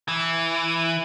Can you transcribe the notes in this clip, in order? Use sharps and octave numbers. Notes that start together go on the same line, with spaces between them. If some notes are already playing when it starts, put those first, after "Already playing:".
E3